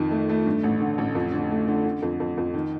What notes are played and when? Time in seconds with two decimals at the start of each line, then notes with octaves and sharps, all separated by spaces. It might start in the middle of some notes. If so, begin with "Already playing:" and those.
Already playing: F2 D#3
0.11 A3
0.29 A3
0.46 G2
0.63 A1
0.80 D3
0.98 A1
1.15 F2
1.33 D3
1.51 A3
1.68 D3
1.84 D3
2.02 F2
2.20 F2
2.37 F2
2.54 D#3